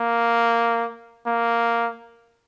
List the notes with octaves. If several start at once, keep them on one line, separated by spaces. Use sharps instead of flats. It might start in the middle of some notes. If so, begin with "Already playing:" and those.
Already playing: A#3
A#3